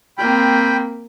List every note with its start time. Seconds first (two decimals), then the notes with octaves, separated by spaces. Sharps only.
0.18 A#3 C4 G5 B5